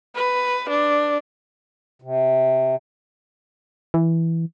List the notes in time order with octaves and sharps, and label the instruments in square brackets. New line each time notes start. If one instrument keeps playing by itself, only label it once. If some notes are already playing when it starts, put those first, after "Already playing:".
[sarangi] B4
D4
[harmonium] C3
[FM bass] E3